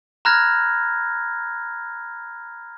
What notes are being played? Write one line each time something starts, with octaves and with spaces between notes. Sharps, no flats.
A#5 B5 F6 F#6 G#6 A#6